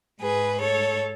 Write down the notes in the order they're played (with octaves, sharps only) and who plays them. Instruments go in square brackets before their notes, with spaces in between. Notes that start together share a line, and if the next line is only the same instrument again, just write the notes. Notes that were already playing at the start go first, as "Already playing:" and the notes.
[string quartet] G#2 G#4 B4
A4 C#5